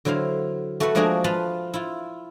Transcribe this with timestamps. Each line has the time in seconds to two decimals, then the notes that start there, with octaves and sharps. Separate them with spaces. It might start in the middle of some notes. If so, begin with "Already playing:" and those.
0.05 D3 F#3 E4 C5 F5
0.80 A3 F#4 A4 B4 F#5
0.95 F3 G#3 A#3 D4 F#4 G#4
1.24 F4 B4 F5 A5 B5
1.74 E4 F4